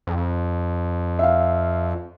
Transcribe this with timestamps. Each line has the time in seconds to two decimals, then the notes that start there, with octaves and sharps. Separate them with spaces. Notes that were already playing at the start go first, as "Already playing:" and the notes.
0.07 F2
1.19 E5 F5